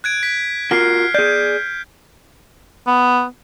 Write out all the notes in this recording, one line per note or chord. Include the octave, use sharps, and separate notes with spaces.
F#6 G#6 D7
B6
F4 F#4 A#4 F6 C7
G#4 D5 G6
B3